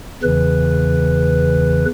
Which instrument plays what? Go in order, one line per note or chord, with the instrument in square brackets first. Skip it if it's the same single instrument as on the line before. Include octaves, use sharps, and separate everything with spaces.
[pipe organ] E2 C#3 E3 B4